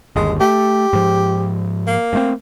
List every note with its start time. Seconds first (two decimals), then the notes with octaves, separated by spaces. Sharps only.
0.16 G1 D#2 G#3
0.40 A3 G4
0.93 G#2 F3
1.87 A#3
2.13 G2 A3 C4